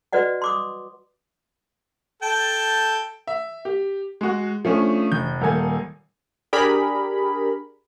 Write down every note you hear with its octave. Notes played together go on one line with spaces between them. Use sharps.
F#4 B4 D5 D#5 F#5
C6 D6 D#6
A4 G5 A5
E5
G4
G#3 F#4
F3 A3 C#4 D4
F1 G6
D#1 A#3 A4 G#5 G#6
D4 G4 G#4 A#4 B5